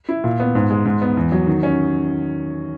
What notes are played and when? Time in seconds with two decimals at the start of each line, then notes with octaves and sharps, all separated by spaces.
0.09 E4
0.24 A#2
0.40 B3
0.55 G#2
0.70 G#3
0.85 G#2
1.02 B3
1.17 E2
1.32 F#3
1.47 D#3
1.63 C#4